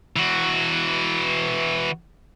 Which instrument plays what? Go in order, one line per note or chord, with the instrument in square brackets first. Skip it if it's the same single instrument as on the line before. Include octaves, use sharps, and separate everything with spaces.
[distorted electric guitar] E3 F#4